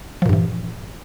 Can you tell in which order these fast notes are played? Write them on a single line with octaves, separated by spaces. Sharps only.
F3 A#2 G2 E3